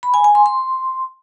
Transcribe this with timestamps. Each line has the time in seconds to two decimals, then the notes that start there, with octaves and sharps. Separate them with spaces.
0.03 B5
0.14 G#5
0.24 G#5
0.35 C6
0.46 C6